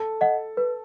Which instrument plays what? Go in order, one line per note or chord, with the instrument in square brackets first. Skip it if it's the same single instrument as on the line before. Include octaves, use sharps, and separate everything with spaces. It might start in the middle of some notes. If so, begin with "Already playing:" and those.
Already playing: [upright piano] A4
[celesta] D#5 F#5
B4